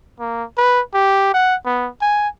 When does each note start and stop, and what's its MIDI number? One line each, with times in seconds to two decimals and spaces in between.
0.20 0.44 58
0.58 0.81 71
0.94 1.31 67
1.34 1.56 78
1.66 1.89 59
2.02 2.29 80